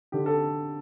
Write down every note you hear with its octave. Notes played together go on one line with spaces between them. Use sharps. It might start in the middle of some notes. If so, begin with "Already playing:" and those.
D3 G4
A4